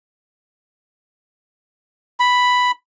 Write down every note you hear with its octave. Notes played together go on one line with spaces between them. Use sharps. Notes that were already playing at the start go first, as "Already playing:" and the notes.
B5